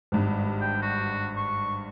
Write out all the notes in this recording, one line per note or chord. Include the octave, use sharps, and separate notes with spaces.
G#1 G2
G5
F#4
C#6